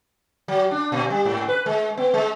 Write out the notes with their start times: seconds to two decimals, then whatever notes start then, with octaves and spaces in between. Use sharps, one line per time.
0.48 F#3
0.71 D4
0.92 A#2
1.10 G3
1.25 G#2
1.49 B4
1.66 G#3
1.97 B3
2.14 G#3